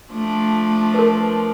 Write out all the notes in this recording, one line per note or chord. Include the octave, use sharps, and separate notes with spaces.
F3 A3 D4
A#4 B4